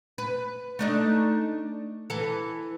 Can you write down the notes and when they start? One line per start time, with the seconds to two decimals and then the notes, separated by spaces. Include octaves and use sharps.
0.18 B4
0.79 A3 D4 D#4
2.10 E3 A4